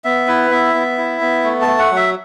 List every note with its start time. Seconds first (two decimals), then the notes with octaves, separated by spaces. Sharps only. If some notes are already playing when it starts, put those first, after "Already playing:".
0.04 B3 E5
0.27 E4 B4
0.51 B3 E5
0.74 B3
0.98 E4
1.21 B3
1.44 A3
1.61 A5
1.67 A3
1.79 F#5
1.91 F#3
1.96 E5